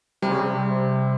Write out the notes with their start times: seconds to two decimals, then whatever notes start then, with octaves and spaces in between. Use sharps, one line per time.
0.22 C3 G3
0.31 C#3
0.41 C3